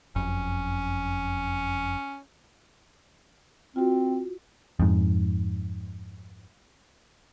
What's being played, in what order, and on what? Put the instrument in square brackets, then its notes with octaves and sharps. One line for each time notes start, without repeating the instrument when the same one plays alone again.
[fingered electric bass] F#1 F2 [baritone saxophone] C#4
[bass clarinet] C4 [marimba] F4 F#4
[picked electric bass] F2 G#2